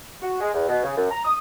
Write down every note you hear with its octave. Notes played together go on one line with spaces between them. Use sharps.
F#4
G#3
E2
B2
C#3
F#2
A#5
D#6